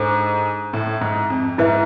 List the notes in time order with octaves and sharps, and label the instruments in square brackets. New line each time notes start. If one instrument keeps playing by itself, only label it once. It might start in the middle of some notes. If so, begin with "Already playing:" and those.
Already playing: [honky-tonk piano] G#2 [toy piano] D4 A4 C5
[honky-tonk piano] A2
G#2
F2
[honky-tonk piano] G#2 [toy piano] E4 B4 E5